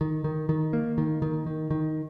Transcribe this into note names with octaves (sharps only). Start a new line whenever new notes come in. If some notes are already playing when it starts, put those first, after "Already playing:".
D#3
D#3
D#3
A#3
D#3
D#3
D#3
D#3